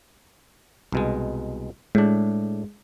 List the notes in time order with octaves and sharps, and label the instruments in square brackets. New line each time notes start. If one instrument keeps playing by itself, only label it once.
[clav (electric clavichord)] C2 B2 G#3
[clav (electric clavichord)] A2 D4 [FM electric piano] G#3